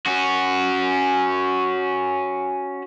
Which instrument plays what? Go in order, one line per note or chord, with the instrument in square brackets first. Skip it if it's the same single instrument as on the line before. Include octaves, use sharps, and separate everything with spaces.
[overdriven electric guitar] C#4 F#4